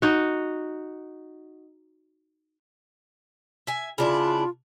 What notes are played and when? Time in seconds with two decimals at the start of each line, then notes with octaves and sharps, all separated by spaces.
0.02 D#4 F#4
3.67 E5 G#5
3.98 C#3 D4 E4 F4